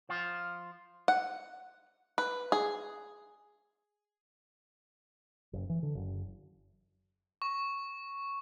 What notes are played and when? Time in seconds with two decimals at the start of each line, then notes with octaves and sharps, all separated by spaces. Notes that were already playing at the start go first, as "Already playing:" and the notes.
0.09 F3 F4
1.08 F#5
2.18 B4
2.52 G#4
5.53 F#1
5.69 E3
5.83 D3
5.95 F#1
7.42 C#6